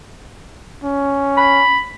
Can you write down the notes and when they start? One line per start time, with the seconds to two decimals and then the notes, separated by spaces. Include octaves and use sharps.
0.84 C#4
1.37 B5